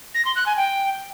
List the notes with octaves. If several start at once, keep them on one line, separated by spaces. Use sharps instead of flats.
A#6
C6
F#6
G#5
G5